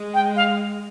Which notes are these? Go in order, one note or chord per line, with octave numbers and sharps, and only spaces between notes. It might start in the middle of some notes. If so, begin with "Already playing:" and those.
Already playing: G#3
G5
F5